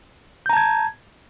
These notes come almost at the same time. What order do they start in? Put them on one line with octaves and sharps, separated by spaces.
G6 A#5 A5 G#6